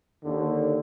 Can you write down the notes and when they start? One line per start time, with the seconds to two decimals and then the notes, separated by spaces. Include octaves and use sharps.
0.24 D#2 D3